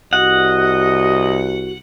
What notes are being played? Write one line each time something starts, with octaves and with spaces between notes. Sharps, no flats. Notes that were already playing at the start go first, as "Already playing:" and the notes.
C2 F#4 D#5 F#5